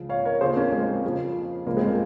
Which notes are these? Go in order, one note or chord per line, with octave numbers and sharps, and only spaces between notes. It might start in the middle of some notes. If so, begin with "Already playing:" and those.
Already playing: C#2 C#3 F3
C#5 F5
A#4 C#5
D#2 C#3 F3 G#4 C5
A#3 C#4
G#3 C4
F2 C#3 F3
C#2 C#3 F3 A#3
G#3 C4
A#3